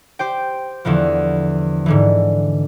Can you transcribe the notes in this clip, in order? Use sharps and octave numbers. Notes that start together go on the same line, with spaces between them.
G4 C5 G5
E2 D3 E3 F3
G#2 D3 E3